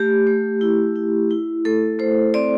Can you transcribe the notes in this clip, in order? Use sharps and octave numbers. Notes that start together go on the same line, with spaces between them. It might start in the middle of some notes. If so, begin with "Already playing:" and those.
Already playing: A3 G4
A3
E4
E4
E4
A3 A4
A3 C5
C4 D5